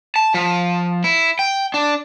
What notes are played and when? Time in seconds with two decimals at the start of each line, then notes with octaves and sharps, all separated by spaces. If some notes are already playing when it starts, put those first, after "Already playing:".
0.16 A5
0.34 F3
1.04 E4
1.39 G5
1.74 D4